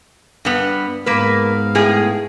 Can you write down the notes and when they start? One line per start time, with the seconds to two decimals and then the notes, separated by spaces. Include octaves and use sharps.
0.45 G2 B3
1.06 G#2 A#3 B3 B4 F5
1.75 A2 G#4